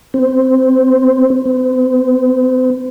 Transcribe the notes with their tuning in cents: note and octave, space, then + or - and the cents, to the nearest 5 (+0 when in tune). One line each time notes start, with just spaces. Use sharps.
C4 -5
C4 -40